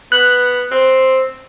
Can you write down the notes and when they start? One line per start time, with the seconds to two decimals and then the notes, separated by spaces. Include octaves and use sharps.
0.12 B3 F#6
0.71 C4